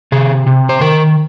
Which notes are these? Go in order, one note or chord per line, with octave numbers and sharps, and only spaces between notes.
C3 G#4
C3
C5
D#3 A#4